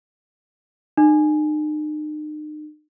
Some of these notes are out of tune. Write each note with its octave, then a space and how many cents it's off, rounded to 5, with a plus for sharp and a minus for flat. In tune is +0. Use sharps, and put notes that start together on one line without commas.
D#4 -40